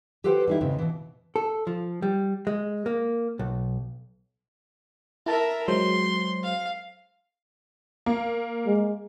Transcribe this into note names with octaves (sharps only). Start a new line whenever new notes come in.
G4 A4 B4 C5 F#5 G5
G3 D#4 E4
G#2 C#3 B3 C4
B2 E3
A4
F3
G3
G#3
A#3
B1
E4 A#4 E5 A5
F#3 G#3 C5 C6
F5
A#3
G#3